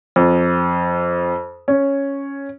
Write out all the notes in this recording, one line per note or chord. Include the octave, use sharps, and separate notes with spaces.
F2
C#4